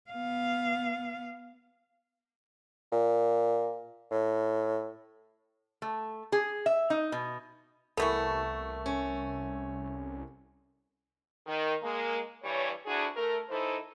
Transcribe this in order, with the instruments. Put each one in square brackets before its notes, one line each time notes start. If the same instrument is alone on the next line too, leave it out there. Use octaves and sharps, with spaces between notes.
[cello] B3 F5
[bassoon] A#2
A2
[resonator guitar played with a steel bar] A3
G#4
E5
D#4
B2
[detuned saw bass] C2 [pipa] E3 A3 B3 [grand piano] A4 A#4 C#6
[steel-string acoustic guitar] C#4
[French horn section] D#3
G#3 A#3
G2 E3 G3 C#5
D2 D4 E4 F#4 G#4
A3 A#4
E3 D#4 E4 A4 C5